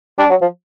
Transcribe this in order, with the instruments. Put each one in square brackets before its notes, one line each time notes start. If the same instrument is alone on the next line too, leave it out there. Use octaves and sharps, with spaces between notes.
[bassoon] G3 [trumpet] D4
[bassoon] F#3
F3